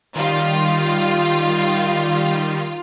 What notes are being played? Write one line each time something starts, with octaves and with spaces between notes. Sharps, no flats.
D#3 G3 F4